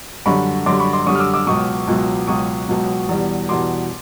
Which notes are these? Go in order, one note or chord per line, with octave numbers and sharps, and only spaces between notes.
F#2 D3 G3 B5 C#6
F#2 D3 G3 C6 D6
B5 C#6
C6 D6
F#2 D3 G3 C#6 D#6
F6
D6 E6
D6 E6
C#2 B2 F#3 C#6 D#6
C#2 B2 F#3
C#2 B2 F#3 C#6 D#6
C#2 B2 F#3
E2 B2 G3
E2 B2 G3 C6 D6